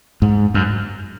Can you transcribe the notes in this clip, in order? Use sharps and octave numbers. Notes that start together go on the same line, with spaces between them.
G#2
F#2